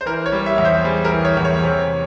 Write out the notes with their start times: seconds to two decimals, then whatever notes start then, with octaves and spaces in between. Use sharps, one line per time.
0.01 C5
0.06 E3 A#4
0.26 C#5
0.32 G3
0.46 E5
0.58 E2
0.65 C5
0.85 G3 G#4
1.04 A#4
1.12 E3
1.25 C#5
1.37 E2
1.45 C#5
1.64 C3